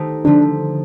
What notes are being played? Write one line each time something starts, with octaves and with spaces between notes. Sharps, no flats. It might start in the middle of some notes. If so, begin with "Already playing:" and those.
Already playing: D#3 A3 D#4 G4 A4 C5
D3 F3 A3 D4